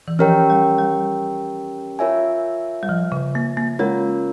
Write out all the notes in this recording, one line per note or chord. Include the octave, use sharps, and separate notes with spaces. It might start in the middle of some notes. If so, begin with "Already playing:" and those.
E3
F3 C#4 G4 A#4 C#5 G5
G3
G3
F4 A#4 C#5 E5 G#5
G3
F3
C#3
A#3
A#3
G#3 C#4 F4 A#4 C#5